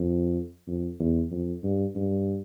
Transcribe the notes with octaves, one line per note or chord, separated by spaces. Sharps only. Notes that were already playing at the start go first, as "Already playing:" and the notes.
Already playing: F2
F2
E2
F2
G2
G2